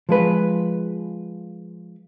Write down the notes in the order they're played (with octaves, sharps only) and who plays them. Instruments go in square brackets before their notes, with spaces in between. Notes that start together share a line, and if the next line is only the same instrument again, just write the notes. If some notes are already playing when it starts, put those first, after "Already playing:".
[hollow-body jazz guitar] F3 G#3 B4